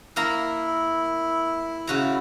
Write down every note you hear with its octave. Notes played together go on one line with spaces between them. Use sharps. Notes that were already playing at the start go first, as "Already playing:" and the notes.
A#3 E4 A#4 A#5
C#3 F#4 A#5